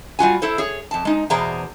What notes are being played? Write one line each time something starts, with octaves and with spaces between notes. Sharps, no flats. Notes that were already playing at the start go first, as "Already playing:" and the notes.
G3 F4 F#4 G#5
E4 A4 C5
G#4 C#5
F2 A5
G#3 D#4
E2 B2 G#4 C5 D5 A#5